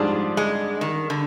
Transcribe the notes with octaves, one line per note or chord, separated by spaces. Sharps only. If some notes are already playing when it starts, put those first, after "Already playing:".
Already playing: G#2 F3 G3 D4 G#4 D5
G#3
D#3
D3